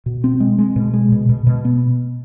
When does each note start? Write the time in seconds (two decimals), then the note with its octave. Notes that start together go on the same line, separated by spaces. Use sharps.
0.06 B2
0.24 C4
0.40 G#3
0.58 G#3
0.76 B2
0.93 G#3
1.12 B2
1.29 B2
1.47 B2
1.65 B3